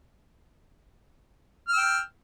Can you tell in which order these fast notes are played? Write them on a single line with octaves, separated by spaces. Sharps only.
F6 E6 G5